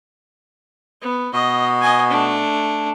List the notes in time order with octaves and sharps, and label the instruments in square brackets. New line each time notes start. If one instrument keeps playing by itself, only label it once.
[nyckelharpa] B3
[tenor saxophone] B2 [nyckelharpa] D#5
[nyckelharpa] D#5 G#5
A3 D4